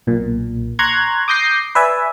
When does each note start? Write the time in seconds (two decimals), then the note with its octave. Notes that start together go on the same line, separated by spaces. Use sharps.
0.07 B1 A#2
0.79 A#5 C6 C#6 F#6 G#6
1.28 D6 D#6 G6 A#6 C7
1.75 B4 D5 E5 G#5